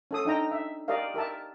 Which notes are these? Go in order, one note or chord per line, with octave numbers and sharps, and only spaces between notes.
C#4 A4 D#6
D4 D#4 G5 A#5
E5
G4 A#4 D5 D#5 F5
G4 A#4 E5 A5